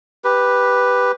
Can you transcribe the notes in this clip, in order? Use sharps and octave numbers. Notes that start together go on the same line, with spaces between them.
G4 B4